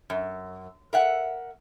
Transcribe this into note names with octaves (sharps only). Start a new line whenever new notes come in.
F#2
A#4 E5 F#5